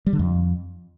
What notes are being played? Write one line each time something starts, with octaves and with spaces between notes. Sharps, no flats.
G3
D3
F2